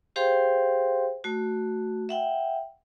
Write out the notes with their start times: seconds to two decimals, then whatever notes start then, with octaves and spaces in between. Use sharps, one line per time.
0.16 G4 G#4 C5 F5 G5 C6
1.24 A3 F#4
2.09 E5 F#5 G5